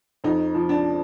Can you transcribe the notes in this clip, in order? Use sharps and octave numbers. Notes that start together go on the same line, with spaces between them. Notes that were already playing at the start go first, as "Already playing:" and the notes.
F2 D#4
F3
D4